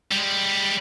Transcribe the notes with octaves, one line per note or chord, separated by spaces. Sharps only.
G3 G#3